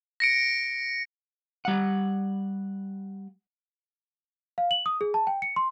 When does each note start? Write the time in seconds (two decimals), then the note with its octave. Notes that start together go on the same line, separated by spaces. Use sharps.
0.20 A#6 C#7 D7
1.65 G3 F#5
4.58 F5
4.71 F#7
4.86 D#6
5.01 G#4
5.14 A5
5.27 G5
5.42 C#7
5.56 C6